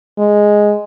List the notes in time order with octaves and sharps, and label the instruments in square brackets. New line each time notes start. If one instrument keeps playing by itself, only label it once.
[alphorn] G#3